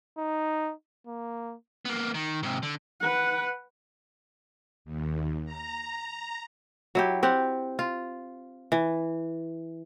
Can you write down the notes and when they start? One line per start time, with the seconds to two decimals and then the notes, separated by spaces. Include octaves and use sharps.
0.18 D#4
1.07 A#3
1.85 A#3 B3
2.14 D#3
2.43 G#2 C3
2.63 D3
3.01 B4 F#5
4.85 D#2
5.45 A#5
6.95 F#3 E4 G4
7.23 C4 G4 F#5
7.79 F4
8.72 E3